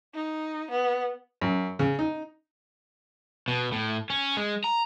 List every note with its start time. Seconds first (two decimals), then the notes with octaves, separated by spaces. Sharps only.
0.14 D#4
0.71 B3
1.41 F#2
1.79 C#3
1.99 D#4
3.48 B2
3.72 A2
4.10 C#4
4.37 G#3
4.64 A#5